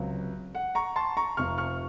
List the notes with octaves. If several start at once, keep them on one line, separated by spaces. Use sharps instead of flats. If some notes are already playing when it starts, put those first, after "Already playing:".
Already playing: C#2 C3 F#3
F#5
A#5 C#6
A5 C6
A#5 C#6
F1 F2 C3 F3 C#6 F6
C#6 F6